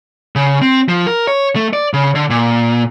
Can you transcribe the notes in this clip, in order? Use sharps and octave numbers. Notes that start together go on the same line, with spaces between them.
C#3
C4
F3
A#4
C#5
A3
D5
C#3
D3
A#2